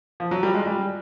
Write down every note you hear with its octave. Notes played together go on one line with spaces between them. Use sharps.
F3
F#3
G3
G#3
G3